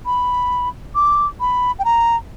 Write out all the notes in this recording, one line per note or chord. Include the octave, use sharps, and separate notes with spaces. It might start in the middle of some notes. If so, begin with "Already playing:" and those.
B5
D6
B5
G5
A#5